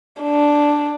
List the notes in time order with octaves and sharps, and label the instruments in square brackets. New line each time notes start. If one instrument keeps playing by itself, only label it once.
[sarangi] D4